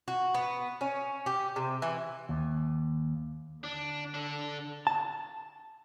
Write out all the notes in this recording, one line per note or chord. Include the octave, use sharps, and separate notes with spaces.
F#4
B3
C#4
G4
C3
E3
D#2
D3 D4
D4 A4
A5